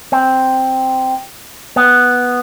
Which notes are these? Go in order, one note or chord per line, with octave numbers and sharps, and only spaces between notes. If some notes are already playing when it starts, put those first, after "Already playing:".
C4
B3